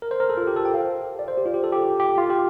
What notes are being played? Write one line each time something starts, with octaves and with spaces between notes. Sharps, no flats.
A#4
C5
A#4
A4
F4
G4
A4
G5
F5
D5
C5
G4
F4
G4
A4
G4
G4
F4
G4